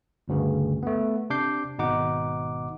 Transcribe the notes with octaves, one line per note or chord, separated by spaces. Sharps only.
G1 D2 G2 C#3
A3 B3
C3 D4 D6 G6 C7
G#1 B2 D#4 F#5 D6